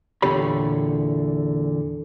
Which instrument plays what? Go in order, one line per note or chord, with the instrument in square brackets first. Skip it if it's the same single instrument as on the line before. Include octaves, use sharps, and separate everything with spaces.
[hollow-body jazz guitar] E2 A#2 D3 G4 C#5 B5